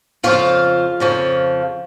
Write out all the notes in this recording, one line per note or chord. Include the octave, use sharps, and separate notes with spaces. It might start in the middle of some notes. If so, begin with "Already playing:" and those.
F2 C#3 F3 F4 F5
F2 C#3 F3